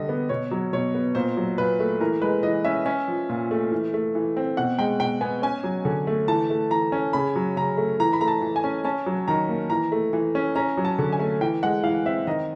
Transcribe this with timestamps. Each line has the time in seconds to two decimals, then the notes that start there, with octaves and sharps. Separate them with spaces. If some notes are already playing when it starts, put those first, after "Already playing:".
Already playing: D3 G3 D#5
0.09 B3
0.29 B2 C#5
0.51 F#3
0.73 B2 C#5
0.95 B3
1.15 A#2 C5
1.37 F#3
1.58 A#2 B4
1.80 A3
2.00 E3 A#4
2.22 G#3 B4
2.43 E3 D#5
2.64 C#4 E5
2.86 C#4
3.08 F3
3.29 A#2
3.51 A3
3.71 E3
3.94 A3
4.15 E3
4.37 C4
4.57 B2 F#5
4.79 G#3 G5
5.00 B2 G5
5.21 B3 G#5
5.42 C#4 G#5
5.64 F#3
5.85 D3
6.07 A3
6.28 E3 A5
6.50 A3
6.70 E3 A#5
6.92 C#4
7.13 C#3 B5
7.36 F#3
7.56 C#3 A#5
7.77 A3
8.00 E3 A#5
8.13 B5
8.21 A3 A#5
8.28 A5
8.42 E3
8.56 G#5
8.64 C#4
8.85 C#4 A5
9.06 F#3
9.28 D#3 A#5
9.49 A#3
9.70 E3 A#5
9.92 A3
10.13 E3
10.35 C#4
10.56 C#4 A#5
10.77 F#3
10.85 A5
10.99 D3
11.12 G#5
11.19 A3
11.41 E3 G5
11.63 G#3 F#5
11.84 E3 F5
12.05 C4 E5
12.27 D#3 D#5